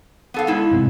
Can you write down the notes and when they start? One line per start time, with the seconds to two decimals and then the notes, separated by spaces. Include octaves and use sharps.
0.34 B3 A4 F5
0.47 G#3 E4
0.71 G#2 C3